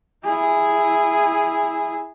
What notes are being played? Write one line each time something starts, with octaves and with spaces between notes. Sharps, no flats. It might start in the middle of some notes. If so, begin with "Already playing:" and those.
E4 G#4